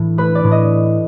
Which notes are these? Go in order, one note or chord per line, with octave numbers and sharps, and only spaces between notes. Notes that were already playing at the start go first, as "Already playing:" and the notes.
Already playing: A2 E3
A3 B4
D5
A2
D#5